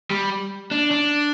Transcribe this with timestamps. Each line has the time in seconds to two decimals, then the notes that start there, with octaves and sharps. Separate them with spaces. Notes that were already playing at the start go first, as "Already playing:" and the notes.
0.10 G3
0.71 D4
0.91 D4